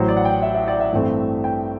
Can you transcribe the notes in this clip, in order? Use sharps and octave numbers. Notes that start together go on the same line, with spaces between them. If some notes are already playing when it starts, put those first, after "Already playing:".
Already playing: A1 A2 F#3 C5
D5
F#5
G5
E5
E5
D5
E5
A1 G2 E3 A3 C4
G5